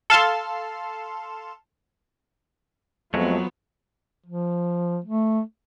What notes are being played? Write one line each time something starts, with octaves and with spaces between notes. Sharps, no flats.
A4 F5 A5 C6
F2 F3 F#3 G#3 A3 B3
F3
A3